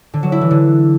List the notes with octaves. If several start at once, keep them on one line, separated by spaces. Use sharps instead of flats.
D3
F#3
E4
E3
D3